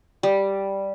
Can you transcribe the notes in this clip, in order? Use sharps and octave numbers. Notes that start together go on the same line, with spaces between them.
G3